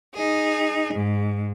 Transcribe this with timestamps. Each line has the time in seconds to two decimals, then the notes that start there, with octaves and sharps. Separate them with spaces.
0.14 D#4 G#4
0.95 G#2